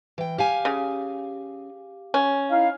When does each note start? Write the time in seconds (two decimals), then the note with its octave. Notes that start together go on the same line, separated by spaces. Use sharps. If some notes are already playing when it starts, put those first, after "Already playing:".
0.18 E3 G5
0.38 G4 F5 G#5
0.65 C#3
2.14 C#4
2.50 D#4 E4 F5